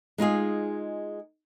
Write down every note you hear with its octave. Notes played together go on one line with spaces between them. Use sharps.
G#3 D#4 F4 G#4